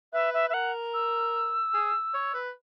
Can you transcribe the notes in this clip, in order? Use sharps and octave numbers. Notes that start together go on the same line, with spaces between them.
B4 E5
E5
B4 E5
A#4 F#5
E6
G#4
C#5
B4